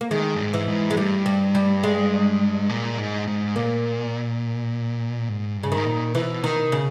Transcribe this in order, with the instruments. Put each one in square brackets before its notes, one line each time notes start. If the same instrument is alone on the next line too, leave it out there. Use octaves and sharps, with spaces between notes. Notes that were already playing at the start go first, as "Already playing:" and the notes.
[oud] A#3
[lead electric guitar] D#3 [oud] G#3
[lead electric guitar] G2
G#2
[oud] E3
[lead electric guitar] G#2
[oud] G#3
[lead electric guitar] G2 [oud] G3
[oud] G3
G3
G#3
[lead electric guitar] A#2
G#2
G#2
[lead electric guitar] A#2 [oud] A#3
[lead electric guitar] G#2
G2
[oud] C#3
D#3
[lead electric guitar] G#2
A#2
[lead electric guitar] B2 [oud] E3
[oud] D#3
C#3